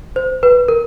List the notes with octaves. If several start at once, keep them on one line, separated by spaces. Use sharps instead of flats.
C5
B4
A#4